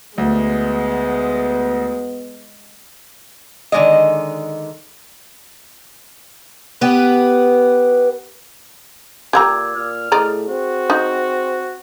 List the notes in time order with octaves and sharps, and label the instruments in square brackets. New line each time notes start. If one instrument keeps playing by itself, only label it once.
[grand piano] D2 [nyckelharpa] G#3 [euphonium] B3
[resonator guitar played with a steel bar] D3 D#3 G#3 D5 D#5
[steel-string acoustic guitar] B3 G4 B4
[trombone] A#2 [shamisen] G4 F#5 A#5 [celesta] D6 E6 G#6
[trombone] A#2 [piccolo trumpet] F6
[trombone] A2 [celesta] G#4 [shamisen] D5 D#5 A#5
[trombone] C4 [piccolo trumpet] F#4
[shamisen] D#4